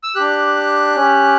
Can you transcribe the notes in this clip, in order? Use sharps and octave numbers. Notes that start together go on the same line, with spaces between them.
E6
D4 G4 F#6
C#4 G4